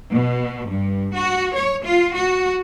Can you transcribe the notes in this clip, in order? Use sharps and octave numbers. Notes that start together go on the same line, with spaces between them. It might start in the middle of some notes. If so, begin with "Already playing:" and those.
B2
G2
F#4
C#5
F4
F#4